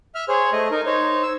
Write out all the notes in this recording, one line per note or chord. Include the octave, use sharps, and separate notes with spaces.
E5 F6
G#4 C5 C#5
A3 D#5
D#4 A#4
D#4 C5 C#5
E6